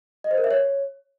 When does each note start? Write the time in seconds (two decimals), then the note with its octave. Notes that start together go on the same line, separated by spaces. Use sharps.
0.24 D#5
0.31 C5
0.37 A#4
0.44 E5
0.51 C#5